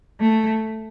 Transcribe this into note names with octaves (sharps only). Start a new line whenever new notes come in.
A3